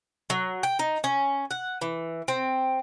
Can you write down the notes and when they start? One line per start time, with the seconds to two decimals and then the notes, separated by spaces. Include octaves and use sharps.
0.30 F#3
0.63 G5
0.79 D#4
1.04 C#4
1.51 F#5
1.81 E3
2.28 C4